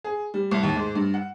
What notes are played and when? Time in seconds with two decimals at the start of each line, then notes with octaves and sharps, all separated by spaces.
0.04 G#4
0.34 G3
0.51 C2
0.63 D#2
0.76 G#2
0.95 G2
1.14 F#5